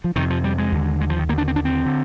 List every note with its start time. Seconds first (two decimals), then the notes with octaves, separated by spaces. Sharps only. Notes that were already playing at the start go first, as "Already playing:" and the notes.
0.04 F3
0.16 F2 C3 D#3
0.30 F3
0.44 G3
0.58 G#3
0.72 D#2 D3
1.01 G#3
1.10 F3
1.19 D#3
1.29 D#2 D3 A#3
1.38 D4
1.48 C4
1.56 D4
1.65 C4
1.86 D3